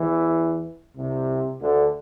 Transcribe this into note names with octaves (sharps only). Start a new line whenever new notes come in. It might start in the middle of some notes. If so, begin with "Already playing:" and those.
Already playing: E2 E3
C2 C3
D2 D3